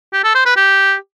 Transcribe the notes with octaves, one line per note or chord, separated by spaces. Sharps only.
G4
A4
C5
B4
G4